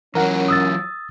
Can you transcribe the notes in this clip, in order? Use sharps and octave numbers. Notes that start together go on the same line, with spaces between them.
E3 F#3 C#4 A#4 F#5
D#6 E6 A6